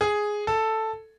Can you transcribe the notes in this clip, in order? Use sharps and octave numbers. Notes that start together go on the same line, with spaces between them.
G#4
A4